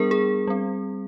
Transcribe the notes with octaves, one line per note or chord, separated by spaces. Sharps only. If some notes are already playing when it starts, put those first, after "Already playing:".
Already playing: G3 B3 D4 G#4 A#4
G#4
G3 C4